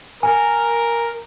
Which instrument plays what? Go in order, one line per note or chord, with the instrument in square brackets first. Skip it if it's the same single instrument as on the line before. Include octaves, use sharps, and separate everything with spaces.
[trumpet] A#4 [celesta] G#5